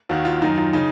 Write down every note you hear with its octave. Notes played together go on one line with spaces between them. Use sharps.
D#2 D#3 F#4
F4
F#2 D#3 D#4
F4
C#3 D#4